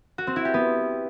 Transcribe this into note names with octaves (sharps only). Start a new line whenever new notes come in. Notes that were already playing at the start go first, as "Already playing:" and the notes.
F#4
C4
E4
G4
B3